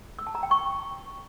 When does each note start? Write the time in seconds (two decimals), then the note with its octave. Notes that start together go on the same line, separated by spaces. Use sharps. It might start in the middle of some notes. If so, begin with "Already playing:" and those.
0.19 E6
0.27 A5
0.35 A#5
0.43 G5
0.51 C#6